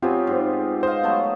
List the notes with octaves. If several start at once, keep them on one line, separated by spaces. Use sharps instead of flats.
F#3 B3 C4 F4 G4 G#5
G#2
C5 D#5 F5
F#3 A3 B3